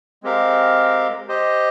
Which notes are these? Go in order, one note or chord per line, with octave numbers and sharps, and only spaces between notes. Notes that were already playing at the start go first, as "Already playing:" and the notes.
G#3 C4 G4 A#4 F5
G4 C5 D#5